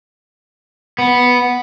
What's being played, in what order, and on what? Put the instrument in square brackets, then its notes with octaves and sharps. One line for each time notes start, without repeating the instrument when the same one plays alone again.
[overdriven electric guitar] B3